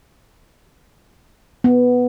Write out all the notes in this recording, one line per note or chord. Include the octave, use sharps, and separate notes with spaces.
B3